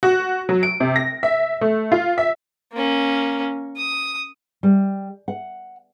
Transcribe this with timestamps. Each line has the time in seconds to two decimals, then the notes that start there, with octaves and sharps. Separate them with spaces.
0.03 F#4
0.49 F#3
0.63 D7
0.80 C3
0.96 A#6
1.23 E5
1.61 A3
1.92 F4
2.18 E5
2.73 A#3 C#4
3.77 D#6
4.63 G3
5.28 F#5